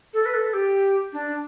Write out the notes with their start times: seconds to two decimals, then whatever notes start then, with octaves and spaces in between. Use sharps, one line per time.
0.14 A4
0.26 B4
0.34 A4
0.54 G4
1.13 D4